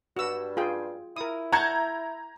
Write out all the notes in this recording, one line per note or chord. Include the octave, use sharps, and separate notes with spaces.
G2 F#4 E6
F4 G#4 G5
E4 A#4 D#6
F#5 A5 A#5 C#6 G6 G#6